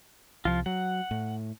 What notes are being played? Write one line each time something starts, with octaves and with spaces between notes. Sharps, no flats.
C2 F3 F4
F#3 F#5
A2